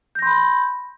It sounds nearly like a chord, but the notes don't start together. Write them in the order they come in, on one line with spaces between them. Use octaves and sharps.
G6 A#6 C6 B5